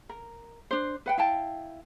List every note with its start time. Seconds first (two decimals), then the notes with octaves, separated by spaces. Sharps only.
0.09 A#4
0.71 D4 C5
1.06 B4 F#5 G5
1.18 E4 F5 G5 A5